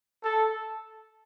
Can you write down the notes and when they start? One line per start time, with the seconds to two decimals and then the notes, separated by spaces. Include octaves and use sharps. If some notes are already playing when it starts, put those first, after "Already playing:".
0.24 A4